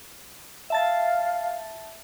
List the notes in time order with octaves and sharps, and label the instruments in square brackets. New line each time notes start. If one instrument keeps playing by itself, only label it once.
[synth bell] E5 A5 A6 [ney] F5